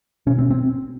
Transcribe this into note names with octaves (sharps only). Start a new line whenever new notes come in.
B2 C#4
C4
C4